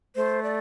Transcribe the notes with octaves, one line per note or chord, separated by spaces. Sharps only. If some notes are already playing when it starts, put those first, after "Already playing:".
A3 C5
D5